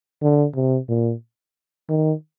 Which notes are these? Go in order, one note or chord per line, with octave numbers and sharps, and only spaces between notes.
D3
C3
A#2
D#3